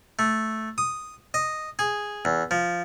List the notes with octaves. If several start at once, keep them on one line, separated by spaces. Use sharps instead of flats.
A3
D#6
D#5
G#4
E2
F3